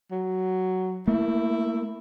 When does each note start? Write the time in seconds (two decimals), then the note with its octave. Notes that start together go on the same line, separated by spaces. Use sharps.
0.11 F#3
1.08 A3 A#3 E4